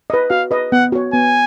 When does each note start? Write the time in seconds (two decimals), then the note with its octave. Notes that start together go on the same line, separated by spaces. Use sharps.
0.10 B4 D#5
0.30 F#4 F5
0.51 B4 D#5
0.72 B3 F#5
0.92 F#4 C#5
1.13 B3 G#5